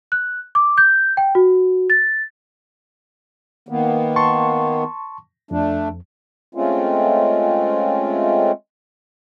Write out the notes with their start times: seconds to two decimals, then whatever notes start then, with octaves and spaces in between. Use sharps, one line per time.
0.12 F#6
0.55 D6
0.78 G6
1.17 G5
1.35 F#4
1.90 A6
3.69 D#3 A#3 B3
4.16 A5 C6 C#6
5.51 F2 A3 D4
6.55 G#3 A3 C4 C#4 F4